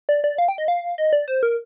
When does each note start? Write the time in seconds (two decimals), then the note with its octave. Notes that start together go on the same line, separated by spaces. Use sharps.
0.09 D5
0.24 D5
0.38 F5
0.48 G5
0.58 D#5
0.68 F5
0.98 D#5
1.13 D5
1.28 C5
1.43 A#4